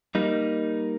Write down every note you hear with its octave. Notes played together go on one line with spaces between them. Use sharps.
G3 A#3 D#4